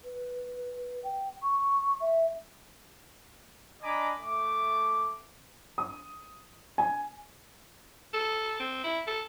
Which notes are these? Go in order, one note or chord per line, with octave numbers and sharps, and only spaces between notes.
B4
G5
C#6
E5
D4 D#5 G#5 A#5 B5 D6
A3 D6
D#6
G#5
A4
C4
E4
A4